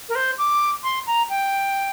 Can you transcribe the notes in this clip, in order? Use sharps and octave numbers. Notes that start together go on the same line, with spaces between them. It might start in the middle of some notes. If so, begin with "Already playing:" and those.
A#4
C5
D6
C6
A#5
G5